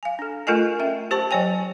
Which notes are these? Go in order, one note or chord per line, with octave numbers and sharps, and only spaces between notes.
F5 G#5
D4 A4
A3 F4 A4 A#4 D#5 G#5
C#4 E5 G5
G4 C5 A5 C#6
F#3 C5 C#5 G5 G#5